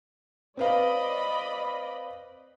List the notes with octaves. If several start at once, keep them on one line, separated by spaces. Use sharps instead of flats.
C4 B4 D5 D#5 F5 B5